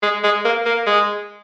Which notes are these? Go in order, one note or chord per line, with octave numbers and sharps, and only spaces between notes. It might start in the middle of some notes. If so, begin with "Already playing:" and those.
G#3
G#3
A#3
A#3
G#3